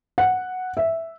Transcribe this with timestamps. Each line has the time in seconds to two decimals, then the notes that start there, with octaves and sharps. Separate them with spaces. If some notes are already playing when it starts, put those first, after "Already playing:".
0.18 F#5
0.77 E5